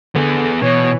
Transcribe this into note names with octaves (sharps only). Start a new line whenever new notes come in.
D3 B3 G#4
B2 E3 C#5